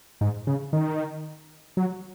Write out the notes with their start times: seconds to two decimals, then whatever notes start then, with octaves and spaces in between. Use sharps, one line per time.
0.21 G#2
0.47 C#3
0.73 D#3
1.77 F#3